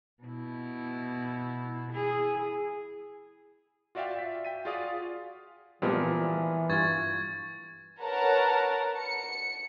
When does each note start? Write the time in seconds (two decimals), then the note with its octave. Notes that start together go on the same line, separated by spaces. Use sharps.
0.23 B2 E4
1.91 E4 G#4
3.95 F4 F#4 D5 E5 F5 G5
4.15 E5 B6
4.45 G5 B6 D#7
4.65 F4 F#4 G#4 D5 F5 D#6
5.82 A#2 E3 F3 G3 G#3 B3 C4
6.70 G2 F4 C#6 G#6 A6
8.02 A#4 B4 C#5 F#5 A5 A#5
8.99 C#7